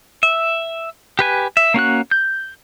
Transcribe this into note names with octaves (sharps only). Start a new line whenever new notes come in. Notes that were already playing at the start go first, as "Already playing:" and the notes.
E5
G4 B4 G#5
E5
A#3 C#4 F#4 F#6
G6